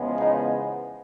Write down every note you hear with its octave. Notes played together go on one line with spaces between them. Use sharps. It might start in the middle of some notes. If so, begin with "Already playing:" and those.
Already playing: E2 C#3 F3 G#3 B3
D#4